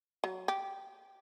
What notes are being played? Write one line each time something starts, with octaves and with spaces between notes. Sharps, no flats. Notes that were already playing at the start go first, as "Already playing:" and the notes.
F#3
G4